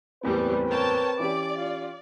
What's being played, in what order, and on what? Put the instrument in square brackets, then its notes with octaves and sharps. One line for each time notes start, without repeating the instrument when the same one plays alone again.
[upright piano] F#1 E2 A2 [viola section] G3 [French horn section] C4 B4
[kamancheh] A#4 C#5 [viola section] G5 A5
[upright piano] E3 C#4 G4 [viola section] D5 [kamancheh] D6
[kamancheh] F4